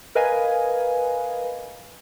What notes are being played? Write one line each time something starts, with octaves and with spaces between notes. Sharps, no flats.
A#4 B4 D#5 F5 G#5